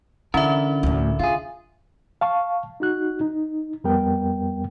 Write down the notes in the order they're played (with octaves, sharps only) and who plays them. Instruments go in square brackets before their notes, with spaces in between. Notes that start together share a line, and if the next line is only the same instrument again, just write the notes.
[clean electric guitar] D3 E4 A#4 [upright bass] E3 [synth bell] C#4 E5
[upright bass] D2 A2
[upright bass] D3 [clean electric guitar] F4 G#4
[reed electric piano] F5 A5 C#6
D#4 F#4 F#6
D#4
F2 G3 B3 A#4 G5